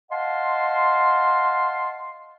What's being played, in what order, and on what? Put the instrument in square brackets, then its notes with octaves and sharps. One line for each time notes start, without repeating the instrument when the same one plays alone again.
[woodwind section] D#5 F5 F#5 A5 C6